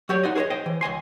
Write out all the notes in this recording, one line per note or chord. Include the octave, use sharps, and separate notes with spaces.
F#3 F#4 G4 C#5 D5
D#4 F#4 C5 D5 D#5
G#4 A#4 C5 C#5 D#5
C5 D#5 G5
E3
C#2 D#5 G#5 C6